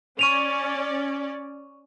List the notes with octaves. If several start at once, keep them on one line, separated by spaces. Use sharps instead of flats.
C#4 D5 C#6 D#7 F7